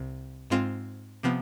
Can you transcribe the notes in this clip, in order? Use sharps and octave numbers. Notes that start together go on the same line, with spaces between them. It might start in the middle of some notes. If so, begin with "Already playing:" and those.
Already playing: C2 C3
G#2 G#3 C4 F4
C3 F3 B3